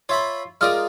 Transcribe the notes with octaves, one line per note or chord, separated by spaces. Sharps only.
F4 C#5 E5 B5
G#3 F4 A#4 D5 D#6 F6